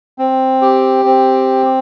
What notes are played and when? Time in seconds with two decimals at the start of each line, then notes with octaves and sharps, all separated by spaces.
0.18 C4
0.62 G4
1.05 C4